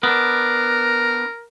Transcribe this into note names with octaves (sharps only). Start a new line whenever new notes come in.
B3 D4 A#4